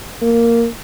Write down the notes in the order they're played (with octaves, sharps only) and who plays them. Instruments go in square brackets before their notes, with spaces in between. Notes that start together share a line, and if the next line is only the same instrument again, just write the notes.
[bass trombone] A#3